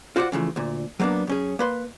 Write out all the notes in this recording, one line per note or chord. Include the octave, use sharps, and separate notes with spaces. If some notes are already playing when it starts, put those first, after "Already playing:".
F4 F#4 C5 D5 F5 F#5
C#3 E3 F3 A3
D2 A#2
F#3 G3 A#3 B3 D4
F#2 C#4 G#4
A#3 B4 C6